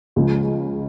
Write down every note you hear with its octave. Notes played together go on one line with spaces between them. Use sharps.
C#2 C#3 F3 G#3